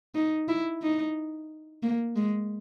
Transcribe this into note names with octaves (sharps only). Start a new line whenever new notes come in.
D#4
E4
D#4
A#3
G#3